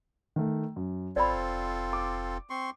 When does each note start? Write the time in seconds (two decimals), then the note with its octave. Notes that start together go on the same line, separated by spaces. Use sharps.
0.36 D#3 A3
0.76 F#2
1.16 G#1 C4 F4 A4 C5 D5 B5
1.36 F1
1.93 D6
2.50 C4 C6 C#6